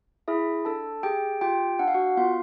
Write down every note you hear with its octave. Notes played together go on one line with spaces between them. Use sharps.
E4 G#4 E5
D4 A4 A5
G4 G#4 G5
F4 G4 G5
D4 F#5
F5
F#4 F#5
B3 F4 F5